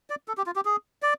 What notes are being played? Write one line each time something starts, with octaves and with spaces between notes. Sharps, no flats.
D5
A4
G4
F4
G4
G#4
D5